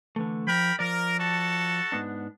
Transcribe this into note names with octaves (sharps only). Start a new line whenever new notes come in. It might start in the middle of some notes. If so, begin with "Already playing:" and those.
D3 E3 A3
F3 A#4 G5 B5
F3 A#4 D5
F#4 A4 A5
G#2 B3 D4